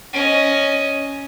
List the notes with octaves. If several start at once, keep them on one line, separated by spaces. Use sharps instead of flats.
C#4 D#5